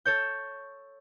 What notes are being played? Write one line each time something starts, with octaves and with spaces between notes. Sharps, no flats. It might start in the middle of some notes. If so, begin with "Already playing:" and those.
A4 C#5 G6